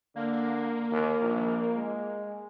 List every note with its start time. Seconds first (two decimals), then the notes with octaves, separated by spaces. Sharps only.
0.16 D3 A#3
0.92 D#2
1.21 A#1
1.76 G#3